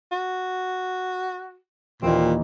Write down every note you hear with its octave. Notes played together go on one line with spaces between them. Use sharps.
F#4
D#2 A#2 E3 C4 D#4